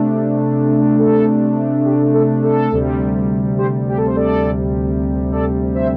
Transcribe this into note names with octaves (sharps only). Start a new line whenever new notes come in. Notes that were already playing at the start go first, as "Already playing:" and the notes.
Already playing: C3 A3 D4
A4
G4
A4
A4
D2 C3 G3
G4 C5
G4
A4
C5
A4 D5
A4 D5
C5 E5